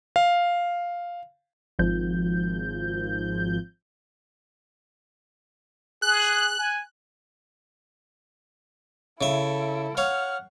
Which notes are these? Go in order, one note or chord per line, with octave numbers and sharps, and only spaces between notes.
F5
G#1 F3 G6
G#4 F#6
G#5
C#3 E4 A4 E5
C#5 F5 F#5 F6